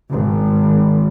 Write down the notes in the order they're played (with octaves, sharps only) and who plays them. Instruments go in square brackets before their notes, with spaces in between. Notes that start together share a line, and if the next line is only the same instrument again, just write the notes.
[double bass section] G#1